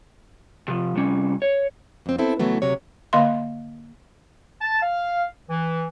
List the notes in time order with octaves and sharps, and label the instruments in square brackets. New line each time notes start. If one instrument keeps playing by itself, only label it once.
[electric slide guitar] C3 F3
C3 G3 C#4
C#5
[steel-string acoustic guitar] F2 C4
B3 C4 E4 A4
C#3 E3 F#3 A3 B3
D2 C3 F#3 C#5
[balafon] D3 A#3 D#5 F5 C6
[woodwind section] A5
F5
E3